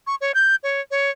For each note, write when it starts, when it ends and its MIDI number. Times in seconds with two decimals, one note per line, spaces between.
0.07 0.15 85
0.21 0.32 73
0.34 0.56 91
0.63 0.81 73
0.91 1.10 73